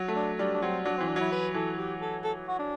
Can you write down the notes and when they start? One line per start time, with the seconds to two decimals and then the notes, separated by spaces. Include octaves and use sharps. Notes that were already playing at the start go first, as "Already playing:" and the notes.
Already playing: F#3
0.08 A3
0.16 D4
0.39 G3 D4
0.54 D4
0.62 F#3 C4
0.85 F#3 D4
0.97 C4
1.01 E3
1.08 D4
1.16 F#3 E4
1.32 B4
1.54 E3 A4
1.78 G4
2.01 A4
2.24 A4
2.48 F#4
2.59 D4